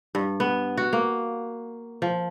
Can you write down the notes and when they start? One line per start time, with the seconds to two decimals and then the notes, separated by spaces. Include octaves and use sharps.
0.15 G2
0.40 B3
0.77 F#4
0.93 A#3
2.02 F3